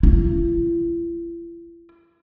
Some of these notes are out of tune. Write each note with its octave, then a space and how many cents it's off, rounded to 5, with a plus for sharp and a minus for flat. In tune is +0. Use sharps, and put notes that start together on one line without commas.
E4 +45